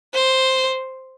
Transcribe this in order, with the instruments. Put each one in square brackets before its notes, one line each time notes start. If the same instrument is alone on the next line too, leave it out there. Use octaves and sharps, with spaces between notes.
[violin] C5